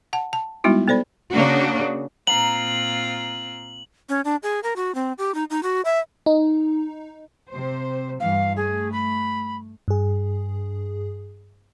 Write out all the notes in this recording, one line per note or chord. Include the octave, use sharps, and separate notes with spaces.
F#5 A5
A5
G3 G#3 B3 D#4 E4 F#4
B3 A4 C5 D5 B5
C#3 A#3 D4 F#4
A#2 C4 F4 A#5 F#7
C#4
D4
G#4
A#4
F#4
C4
G4
D#4
D#4
F#4
E5
D#4
C3 C5
G2 E3 F5
A3 G#4
B5
G2 G#4